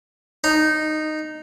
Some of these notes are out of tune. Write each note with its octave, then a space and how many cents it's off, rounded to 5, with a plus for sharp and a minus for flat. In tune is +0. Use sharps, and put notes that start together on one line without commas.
D#4 -10